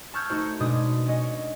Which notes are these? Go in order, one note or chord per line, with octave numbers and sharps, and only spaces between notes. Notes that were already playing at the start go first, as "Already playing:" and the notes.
A5 C#6 E6 F6 G6 G#6
A3 D#4 F#4 C5
B2 G#3 D4 D#6
C#4 D#5